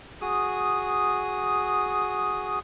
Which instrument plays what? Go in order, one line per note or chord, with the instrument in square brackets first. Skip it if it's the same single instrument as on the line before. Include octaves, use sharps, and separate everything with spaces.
[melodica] F#4 G#4 D#6